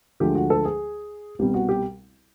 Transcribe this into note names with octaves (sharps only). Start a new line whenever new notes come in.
D2 D3 F3 G#3 G4
F#4
A4
G#4
C2 B2 G3 G4
F#4
G4